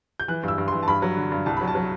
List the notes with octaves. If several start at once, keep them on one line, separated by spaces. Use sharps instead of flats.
G6
E3 F#6
G2 E6
G2
E3 C6
A5
G2 B5
F#3
D3
G2
C2 A5
F#3 B5
A5
F#3